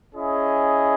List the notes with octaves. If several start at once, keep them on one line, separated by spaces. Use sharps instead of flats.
C#4 E4 G#4 D#5